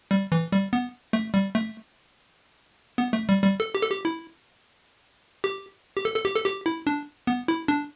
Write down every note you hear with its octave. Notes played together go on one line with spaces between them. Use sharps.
G3
E3
G3
B3
A3
G3
A3
B3
A3
G3
G3
A4
G4
A4
G4
E4
G4
G4
A4
A4
G4
A4
G4
E4
D4
B3
E4
D4